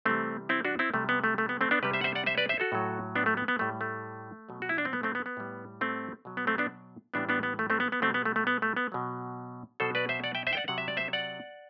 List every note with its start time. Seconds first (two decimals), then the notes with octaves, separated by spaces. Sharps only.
0.05 C3 E3 G3 A3 C4
0.49 C4 E4
0.65 D4 F#4
0.79 C4 E4
0.94 C3 G3 A3
1.09 B3
1.24 A3
1.38 A3
1.49 B3
1.61 A3 C4
1.71 B3 D4
1.83 C3 G3 G4 B4
1.93 C5 E5
2.01 F#5
2.04 C5 E5
2.15 D5 F#5
2.26 C5 E5
2.38 B4 D5
2.49 C5 E5
2.60 F#4 A4
2.72 A2 F#3
3.15 B3 D4
3.26 A3
3.37 B3
3.48 B3
3.59 A2 G3 A3
3.81 A3
4.49 B2 F#3
4.62 F#4
4.69 E4
4.78 D4
4.85 C4
4.93 B3
5.03 A3 C4
5.15 B3
5.26 B3
5.37 A2 G3
5.81 A3 C4
6.25 B2 F#3
6.37 B3
6.47 A3 C4
6.58 B3 D4
7.14 A2 E3 G3 B3 D4
7.29 B3 D4
7.43 B3
7.59 A3
7.70 A3 C4
7.80 B3
7.92 B3
8.02 B2 A3 C4
8.06 G3
8.14 B3
8.25 A3
8.36 A3
8.47 B3
8.62 A3
8.76 B3
8.92 B2 F#3
9.80 B2 F#3 A4 C5
9.95 B4 D5
10.09 C5 E5
10.24 D5 F#5
10.35 E5 G5
10.47 C5 E5
10.53 G5
10.57 D5 F#5
10.68 C3 F#3 F#5
10.78 E5
10.88 D5
10.97 C5 E5
11.13 D5 F#5